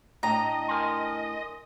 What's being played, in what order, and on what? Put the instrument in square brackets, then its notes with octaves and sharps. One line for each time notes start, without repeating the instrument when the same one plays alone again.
[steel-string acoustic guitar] A2 D4 G5 [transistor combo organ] D#5 [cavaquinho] A#5
[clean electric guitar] A#4 G#5 C6